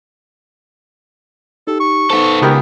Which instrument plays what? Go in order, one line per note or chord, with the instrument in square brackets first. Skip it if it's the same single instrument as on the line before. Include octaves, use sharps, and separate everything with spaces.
[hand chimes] D#4 G4 [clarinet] A4
[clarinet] C#6
[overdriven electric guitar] B3 A4 [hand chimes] D#4 C5
[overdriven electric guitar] C#2 [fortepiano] B3 G4 A#4 [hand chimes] D#6